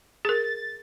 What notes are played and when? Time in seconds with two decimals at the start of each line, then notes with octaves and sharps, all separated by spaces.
0.25 G#4 A#4 A6